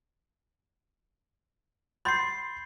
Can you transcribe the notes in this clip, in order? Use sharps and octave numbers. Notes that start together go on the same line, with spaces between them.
B5 C6 G6 A6 C7